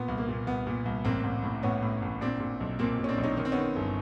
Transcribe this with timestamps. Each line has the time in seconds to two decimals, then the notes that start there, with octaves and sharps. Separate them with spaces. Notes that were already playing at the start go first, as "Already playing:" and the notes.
Already playing: A#2 B3
0.08 C2
0.18 A#3
0.28 A#2
0.47 C2 B3
0.67 A#2
0.85 C2
1.05 A1 A#3 C4
1.24 A1
1.44 A2
1.63 A2 B3 C#4
1.82 A2
2.02 A1
2.21 A#2 C4 D4
2.40 A#2
2.60 B1
2.79 A#2 A#3 C4
2.99 A#2
3.04 C#4
3.09 C4 D4
3.18 B1
3.23 C#4 D#4
3.37 D#3 C#4
3.45 C4
3.52 B3 C#4
3.57 D#3
3.76 G1